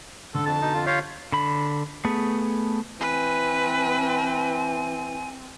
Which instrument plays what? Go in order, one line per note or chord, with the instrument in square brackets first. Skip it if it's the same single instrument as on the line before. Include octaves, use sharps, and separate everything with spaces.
[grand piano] D3 [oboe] A4
[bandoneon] F2 [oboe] A5
[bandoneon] B2 D#4
F2 F4
[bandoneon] F4 C#5 F5 [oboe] G4
[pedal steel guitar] D3 B5
A3 B3 G#4
[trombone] E3 [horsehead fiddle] C4 [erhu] B4 [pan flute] G#5